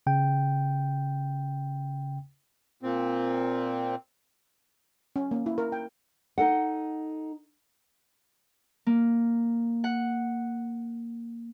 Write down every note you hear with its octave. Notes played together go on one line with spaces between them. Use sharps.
C#3 G5
A#2 C4
C#4
A#3
E4
A#4
G5
D#4 A4 F#5
A#3
F#5